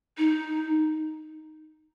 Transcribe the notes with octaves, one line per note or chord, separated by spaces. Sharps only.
D#4